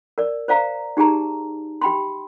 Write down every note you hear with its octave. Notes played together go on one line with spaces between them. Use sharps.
A#4 D5
C5 D5 F5 A#5
D#4 G4 G#4 A5 A#5
G4 G5 B5 C6